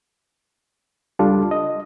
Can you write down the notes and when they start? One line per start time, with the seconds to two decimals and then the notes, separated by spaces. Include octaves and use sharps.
1.19 C#2 G3 D4 F4 A4
1.51 D#5